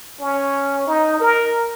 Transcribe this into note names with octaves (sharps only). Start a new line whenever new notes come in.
C#4
D#4
A#4